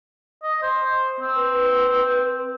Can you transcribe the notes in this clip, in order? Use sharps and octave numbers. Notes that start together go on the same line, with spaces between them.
D#5
C5
C4
B4